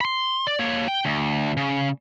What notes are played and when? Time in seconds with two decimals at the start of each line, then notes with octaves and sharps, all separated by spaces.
0.01 B5 C6
0.47 D5
0.59 A#3 C#5
0.88 G5
1.05 D2
1.57 C#3